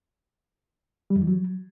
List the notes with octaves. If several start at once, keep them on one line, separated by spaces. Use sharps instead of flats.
G3
F2
E3
F#3